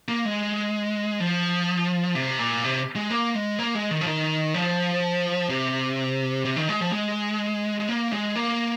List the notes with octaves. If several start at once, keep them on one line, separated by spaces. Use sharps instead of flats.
A#3
G#3
F3
C3
A#2
C3
G#3
A#3
G#3
A#3
G#3
D#3
F3
D#3
F3
C3
C3
D#3
G#3
F3
G#3
G#3
A#3
G#3
A#3